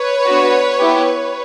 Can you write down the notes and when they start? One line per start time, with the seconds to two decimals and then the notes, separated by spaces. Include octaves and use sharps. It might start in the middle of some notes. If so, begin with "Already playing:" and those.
Already playing: B4 C#5
0.27 B3 D4 F#4
0.80 B3 E4 G4